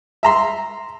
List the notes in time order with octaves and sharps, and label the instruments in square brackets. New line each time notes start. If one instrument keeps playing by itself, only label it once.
[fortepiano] E5 A#5 C6